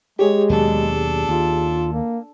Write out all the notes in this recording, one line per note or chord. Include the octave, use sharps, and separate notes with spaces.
G#3 G4 G#4 C#5
D#2 B2 F#3 D4 A4
D#2 F4
A#3